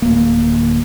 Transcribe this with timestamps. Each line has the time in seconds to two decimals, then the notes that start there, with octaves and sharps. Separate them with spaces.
0.02 D1 A#3